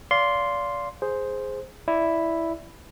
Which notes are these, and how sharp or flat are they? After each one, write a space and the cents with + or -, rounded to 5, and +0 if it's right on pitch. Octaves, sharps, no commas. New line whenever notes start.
D5 -30 F5 +0 C6 +0
G#4 +5 C5 +0
E4 +0 D5 +0